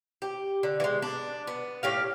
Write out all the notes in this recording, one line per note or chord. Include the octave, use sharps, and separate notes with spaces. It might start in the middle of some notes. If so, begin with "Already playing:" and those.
G4
D3
E3 G#3
D4
B3
A2 G4 F5